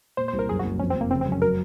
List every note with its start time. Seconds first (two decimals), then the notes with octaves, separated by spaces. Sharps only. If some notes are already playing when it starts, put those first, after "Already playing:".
0.17 A#2 C5
0.28 C5
0.33 C2
0.39 A#4
0.49 F#2 G#4
0.59 F#4
0.64 F#1
0.79 F2 C#4
0.90 C4
0.95 F1
1.01 A#3
1.11 C#3 C4
1.21 C4
1.27 F#2
1.32 C#4
1.42 F#3 A#4